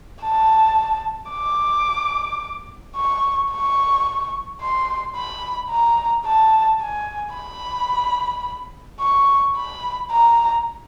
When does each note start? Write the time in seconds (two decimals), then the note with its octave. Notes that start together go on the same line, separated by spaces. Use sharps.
0.23 A5
1.32 D6
2.97 C#6
3.52 C#6
4.62 C6
5.17 B5
5.71 A#5
6.26 A5
6.81 G#5
7.35 B5
9.00 C#6
9.56 B5
10.11 A#5